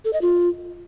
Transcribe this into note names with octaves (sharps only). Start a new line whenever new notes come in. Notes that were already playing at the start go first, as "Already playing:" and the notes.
A4
D#5
F4